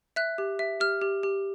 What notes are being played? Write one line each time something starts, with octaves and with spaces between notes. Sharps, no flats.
E5 F#6
G4
E5
G4 F6
G4
G4